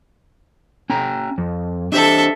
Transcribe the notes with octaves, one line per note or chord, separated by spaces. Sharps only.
C#4 G5 A#5
F2
D4 G4 A4 C5 E5